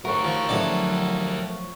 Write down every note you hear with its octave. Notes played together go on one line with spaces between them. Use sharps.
A3 F#4 G4 A#4 C#5
F3
F3 F#3 A3 C#4 D5